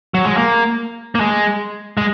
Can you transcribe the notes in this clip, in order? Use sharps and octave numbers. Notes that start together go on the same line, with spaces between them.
F#3
G#3
A#3
A#3
G#3
G#3